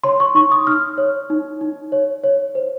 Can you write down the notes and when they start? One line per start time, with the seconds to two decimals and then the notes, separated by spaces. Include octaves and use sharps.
0.04 C#5 C6
0.20 C#6
0.35 D#4 C#6
0.52 D#6
0.67 D#4 F6
0.98 C#5
1.30 D#4
1.61 D#4
1.92 C#5
2.24 C#5
2.55 C5